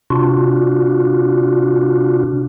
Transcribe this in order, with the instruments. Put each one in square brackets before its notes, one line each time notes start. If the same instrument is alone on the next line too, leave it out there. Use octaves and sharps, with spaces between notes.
[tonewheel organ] C3 D4 F4 F#4